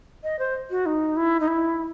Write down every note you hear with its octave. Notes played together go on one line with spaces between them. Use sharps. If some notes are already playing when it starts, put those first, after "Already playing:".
D#5
C5
F#4
D#4
E4
D#4
E4